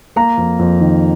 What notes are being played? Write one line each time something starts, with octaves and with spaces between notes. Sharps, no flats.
A#3 A#5
F2
F2
D#3